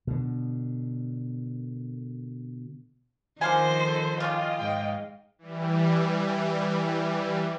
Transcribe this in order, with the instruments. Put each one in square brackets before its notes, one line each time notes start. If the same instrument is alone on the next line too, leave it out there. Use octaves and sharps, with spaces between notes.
[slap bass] B2 D3
[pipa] D3 F5 G#5 [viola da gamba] D#3 F3 [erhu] C5
[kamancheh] A4
[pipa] C#3 C#4 G4 [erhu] F4 [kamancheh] D#5 F5
[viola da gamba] G#2 [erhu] G5
[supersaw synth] E3 G3